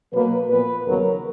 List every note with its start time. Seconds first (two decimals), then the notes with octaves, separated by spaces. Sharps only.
0.13 B2 F#3 A#3 B4
0.49 A#2 F3 B3 B4
0.85 D#2 C#3 F#3 B3 A#4